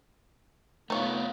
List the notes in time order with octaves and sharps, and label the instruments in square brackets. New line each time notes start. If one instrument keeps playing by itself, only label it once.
[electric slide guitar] A3 F4 [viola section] B3 [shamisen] D#4 C#5